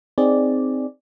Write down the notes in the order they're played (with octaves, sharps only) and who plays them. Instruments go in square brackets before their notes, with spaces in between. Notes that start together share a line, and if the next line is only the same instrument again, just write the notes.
[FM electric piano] C4 D#4 G#4 D5